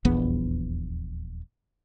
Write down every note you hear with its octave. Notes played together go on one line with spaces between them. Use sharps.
D#1 A#1 E2 B3